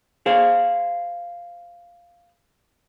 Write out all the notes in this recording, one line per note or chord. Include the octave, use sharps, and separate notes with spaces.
G#4 C5 F5